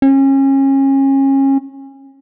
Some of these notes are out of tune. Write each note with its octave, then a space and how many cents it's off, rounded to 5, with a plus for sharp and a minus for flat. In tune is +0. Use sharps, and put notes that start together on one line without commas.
C#4 -30